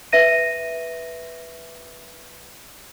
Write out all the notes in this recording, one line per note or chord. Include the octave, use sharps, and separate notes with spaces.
B4 E5 A#6 D#7